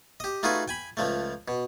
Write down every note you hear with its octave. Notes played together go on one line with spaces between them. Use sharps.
G4 D#5
A3 D#4 F4 F#4 G#4 B4
G5 G#5 B5
C#2 F3 A3
B2